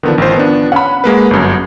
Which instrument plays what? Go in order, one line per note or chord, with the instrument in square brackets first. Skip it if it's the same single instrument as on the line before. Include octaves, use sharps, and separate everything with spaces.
[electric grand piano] D3 B3 D4 [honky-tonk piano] D#3 F3
[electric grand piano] A1 C5
B3 D4
[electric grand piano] C#4 [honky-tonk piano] F#5 B5
[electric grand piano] G#3 A#3 B4
G1 F#2